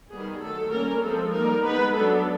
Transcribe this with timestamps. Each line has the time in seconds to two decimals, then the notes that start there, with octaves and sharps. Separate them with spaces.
0.11 D#3 G3 B3 G#4
0.42 D#3 F#3 A3 A4
0.73 G3 A#3 C#4 A#4
1.03 F3 G#3 C4 A4
1.33 G3 A#3 D#4 A#4
1.65 G#3 B3 D#4 B4
1.95 F#3 B3 D4 A4